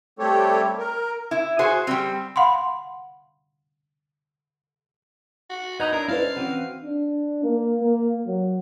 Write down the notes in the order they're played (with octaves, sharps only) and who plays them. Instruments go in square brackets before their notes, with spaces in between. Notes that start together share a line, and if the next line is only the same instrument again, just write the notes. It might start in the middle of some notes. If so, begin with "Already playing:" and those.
[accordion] G3 A3 C4 G4 A4 C#5
A#4
[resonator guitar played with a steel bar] E4
F#4 G#4 C5
G3 C4
[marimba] F5 F#5 B5 C6
[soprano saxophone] F#4
[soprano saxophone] D#4 [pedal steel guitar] B4 A#5 D#6 [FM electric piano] D#5 B5 G#6
[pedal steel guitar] D4 E4 C#5 [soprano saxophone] A#4
[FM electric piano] C#4 E4 B4 [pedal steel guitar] A4 C5 D5 [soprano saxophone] F5
[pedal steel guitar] E3 C4 F#4
[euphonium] D4
A#3
A#3
F#3